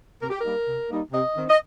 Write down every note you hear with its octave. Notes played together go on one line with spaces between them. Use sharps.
C3 A#4
G4
A#4
G3 A#3 D#4
C3
G3 A#3 D#4
C3 D#5
D#3 C4 D#4
D#5